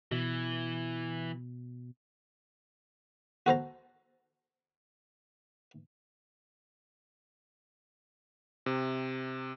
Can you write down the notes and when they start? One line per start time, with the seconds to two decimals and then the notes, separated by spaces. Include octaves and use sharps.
0.11 B2 E3
3.46 F#4 A4 C5 A#5
8.66 C3